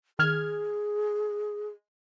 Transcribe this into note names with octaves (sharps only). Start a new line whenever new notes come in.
D#3 G#4 F6 G#6